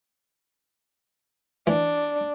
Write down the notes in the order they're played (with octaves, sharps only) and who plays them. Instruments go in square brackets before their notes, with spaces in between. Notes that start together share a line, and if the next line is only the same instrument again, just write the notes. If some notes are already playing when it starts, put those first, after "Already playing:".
[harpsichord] E3 [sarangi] D4